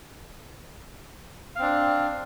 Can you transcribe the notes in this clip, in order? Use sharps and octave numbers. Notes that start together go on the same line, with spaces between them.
C4 D4 F5